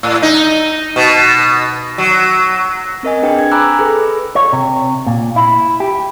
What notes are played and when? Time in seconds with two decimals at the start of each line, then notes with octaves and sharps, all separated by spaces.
0.03 A2
0.23 D#4
0.96 B2
1.98 F#3
3.03 C4 A#4 D#5 G#5
3.23 D4 G#4 B4 G5
3.39 G#6
3.51 G#5 A#5 B5 D6 E6 F#6
3.79 G#4 A4 B4
4.35 C#5
4.53 C3
5.07 A#2
5.36 E4
5.80 G4